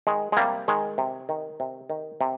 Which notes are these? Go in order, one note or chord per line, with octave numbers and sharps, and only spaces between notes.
D#3 G#3
G#3
C3 G3 A#3
D#3 G#3
C3
D#3
C3
D#3
C3